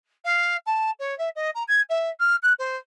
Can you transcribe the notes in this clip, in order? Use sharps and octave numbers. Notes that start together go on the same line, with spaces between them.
F5
A5
C#5
E5
D#5
A#5
G#6
E5
F6
F#6
C5